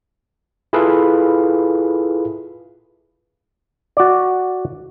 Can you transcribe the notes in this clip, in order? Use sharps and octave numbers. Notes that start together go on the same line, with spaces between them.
E4 F4 G#4 A4 B4 F5
F#4 D5